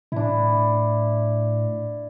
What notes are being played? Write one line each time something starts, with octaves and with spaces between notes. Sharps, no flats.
A2 D4 E4